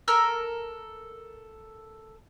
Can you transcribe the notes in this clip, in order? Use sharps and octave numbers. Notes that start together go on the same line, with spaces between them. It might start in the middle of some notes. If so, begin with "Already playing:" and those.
A4 A#4 E6